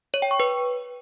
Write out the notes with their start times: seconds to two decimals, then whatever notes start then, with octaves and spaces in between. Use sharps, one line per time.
0.14 C#5
0.22 G5
0.31 C#6
0.40 B4